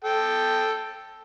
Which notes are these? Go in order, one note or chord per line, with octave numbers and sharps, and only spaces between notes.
A4 G5